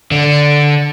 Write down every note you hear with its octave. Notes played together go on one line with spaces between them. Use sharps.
D3